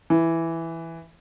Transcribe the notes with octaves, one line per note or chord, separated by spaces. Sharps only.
E3